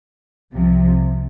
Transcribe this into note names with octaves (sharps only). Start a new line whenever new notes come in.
C2 C3 F3